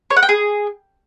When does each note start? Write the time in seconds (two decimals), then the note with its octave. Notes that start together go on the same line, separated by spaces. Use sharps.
0.10 C#5
0.17 F#5
0.23 G5
0.29 G#4